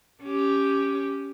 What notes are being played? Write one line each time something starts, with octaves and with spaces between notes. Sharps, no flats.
C#4 G4